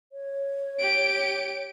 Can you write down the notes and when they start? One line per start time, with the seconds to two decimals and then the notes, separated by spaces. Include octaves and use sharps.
0.12 C#5
0.79 G4 D7